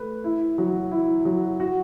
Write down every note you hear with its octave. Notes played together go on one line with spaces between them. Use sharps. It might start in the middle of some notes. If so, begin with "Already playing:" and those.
Already playing: A3 B4
E4
F#3
E4
F#3
F#4